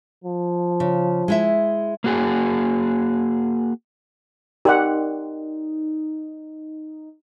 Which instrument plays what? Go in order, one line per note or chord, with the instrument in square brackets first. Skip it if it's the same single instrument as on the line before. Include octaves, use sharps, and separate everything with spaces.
[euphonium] F3
[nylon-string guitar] C#3
G#3 E4 E5
[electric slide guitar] A#3 F#4 G#4
[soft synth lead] D#4 [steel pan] G4 F#5 [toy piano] A#4 D5 C6